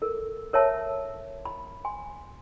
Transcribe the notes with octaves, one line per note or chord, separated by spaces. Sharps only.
A4 A#4
A#4 C#5 E5 A5
B5
G#5 C6